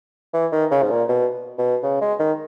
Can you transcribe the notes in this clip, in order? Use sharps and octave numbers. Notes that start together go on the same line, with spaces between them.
E3
D#3
C#3
G#2
A#2
B2
B2
C#3
G#3
D#3